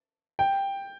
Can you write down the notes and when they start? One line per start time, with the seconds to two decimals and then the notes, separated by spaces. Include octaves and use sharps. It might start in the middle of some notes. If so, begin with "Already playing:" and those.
0.39 G5